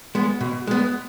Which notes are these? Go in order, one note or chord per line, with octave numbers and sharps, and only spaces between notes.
G#3 B3
B2
G#3 B3